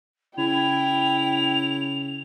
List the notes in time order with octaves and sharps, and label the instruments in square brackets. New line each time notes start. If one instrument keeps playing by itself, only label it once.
[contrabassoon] C#3 [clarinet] E4 [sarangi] G5 [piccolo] F7